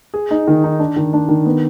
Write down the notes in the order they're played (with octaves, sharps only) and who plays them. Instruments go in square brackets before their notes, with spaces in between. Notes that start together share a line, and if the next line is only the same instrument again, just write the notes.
[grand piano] G#4
D#4
D#3
D#4
D4
D#3
D4
D#3
B3